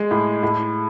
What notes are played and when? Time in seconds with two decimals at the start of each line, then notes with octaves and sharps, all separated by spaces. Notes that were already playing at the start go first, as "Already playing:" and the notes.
Already playing: G#3
0.11 A2
0.43 A2